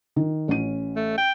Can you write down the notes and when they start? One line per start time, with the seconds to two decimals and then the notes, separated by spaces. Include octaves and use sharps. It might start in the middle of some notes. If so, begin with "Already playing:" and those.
0.16 D#3
0.48 A1 C#4 D#7
0.96 A3
1.18 G5